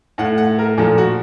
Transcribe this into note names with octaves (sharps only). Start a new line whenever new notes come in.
A2 A3 F#5
F#5
A#4
A#2 F3 A3 A4
F#4